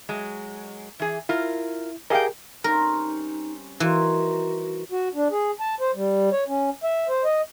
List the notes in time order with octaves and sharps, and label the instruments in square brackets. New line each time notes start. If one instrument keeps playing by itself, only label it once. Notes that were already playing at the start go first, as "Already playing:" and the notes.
[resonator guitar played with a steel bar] F#3 G#3
E3 G#4
[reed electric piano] E4 [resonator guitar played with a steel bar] F4 A#4
[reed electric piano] G4 G#4 A#4 [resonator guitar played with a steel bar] D#5 F5 G5
[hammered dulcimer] G3 C4 C#4 [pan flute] D#4 [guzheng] A#4
[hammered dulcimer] D#3 A#4 C5 [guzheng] E3 [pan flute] F#4
[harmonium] F#4
D4
G#4
A5
C5
G3
C#5
C#4
E5
C5
D#5